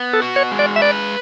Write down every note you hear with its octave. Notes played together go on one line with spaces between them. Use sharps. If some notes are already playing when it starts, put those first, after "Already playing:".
Already playing: B3
A4
F#4
C#5
G#3
D5
E5
B4 D5